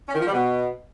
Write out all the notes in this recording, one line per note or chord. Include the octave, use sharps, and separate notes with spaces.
C#4
D#3
F3
G3
B2